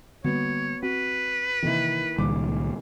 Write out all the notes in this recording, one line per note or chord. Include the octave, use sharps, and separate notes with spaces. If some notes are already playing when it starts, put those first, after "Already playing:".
D3 G3 A#3 B3 F#4 C#5
C4 F#4 B4
C3 D#3 E3 A#3 E4
C#2 A#2 D#3 G3 D6